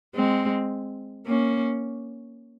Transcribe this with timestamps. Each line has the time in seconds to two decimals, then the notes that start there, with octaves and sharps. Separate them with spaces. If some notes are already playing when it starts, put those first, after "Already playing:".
0.15 G#3 C4
1.27 A#3 C#4